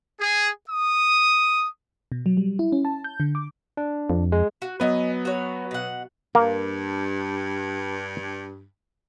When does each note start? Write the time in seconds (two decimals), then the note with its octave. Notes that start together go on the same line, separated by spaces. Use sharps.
0.19 G#4
0.69 D#6
2.12 B2
2.26 F#3
2.37 G3
2.59 E4
2.72 C#4
2.85 A5
3.04 G6
3.20 D3
3.35 D6
3.77 D4
4.10 F2
4.32 G#3
4.62 F#4
4.80 F#3 B3 B4 D#5 G#5
5.25 F#4 C#5
5.71 B2 F#5
6.35 G2 A#3